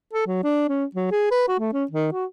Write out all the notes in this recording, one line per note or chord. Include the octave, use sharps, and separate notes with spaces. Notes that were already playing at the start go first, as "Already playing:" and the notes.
A4
F#3
D4
C#4
F#3
G#4
B4
F#4
A3
C#4
D#3
F#4